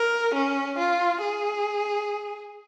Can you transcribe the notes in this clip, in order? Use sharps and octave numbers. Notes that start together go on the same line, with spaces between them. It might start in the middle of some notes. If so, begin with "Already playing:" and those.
Already playing: A#4
C#4
F4
G#4